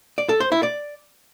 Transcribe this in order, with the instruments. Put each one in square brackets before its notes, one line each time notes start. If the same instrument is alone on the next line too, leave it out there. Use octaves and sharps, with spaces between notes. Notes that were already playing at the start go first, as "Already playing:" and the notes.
[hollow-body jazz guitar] D5
A4
C5
E4
D5